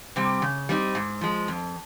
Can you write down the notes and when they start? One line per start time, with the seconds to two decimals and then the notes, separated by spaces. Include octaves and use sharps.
0.16 C3 G3 C4
0.42 C#3
0.69 G3 C4 D#4
0.95 G#2
1.21 F3 G#3
1.48 F2